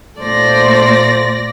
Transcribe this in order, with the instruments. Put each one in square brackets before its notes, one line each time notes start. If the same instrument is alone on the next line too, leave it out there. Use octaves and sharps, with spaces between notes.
[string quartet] A#2 D5 A#6 [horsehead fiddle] A3 C5